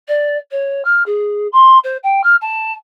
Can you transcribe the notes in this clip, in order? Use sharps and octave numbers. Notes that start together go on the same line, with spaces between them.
D5
C#5
F6
G#4
C6
C5
G5
F6
A5